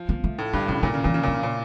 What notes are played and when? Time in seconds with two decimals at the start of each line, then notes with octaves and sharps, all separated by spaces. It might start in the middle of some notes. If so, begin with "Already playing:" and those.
Already playing: F3
0.09 A#3
0.24 A3
0.39 A2
0.53 G2 D3
0.68 A2 C#3
0.83 A#2 D3
0.94 C#3
1.04 A#2 E3
1.14 C#3
1.23 A#2 E3
1.33 C#3
1.43 A#2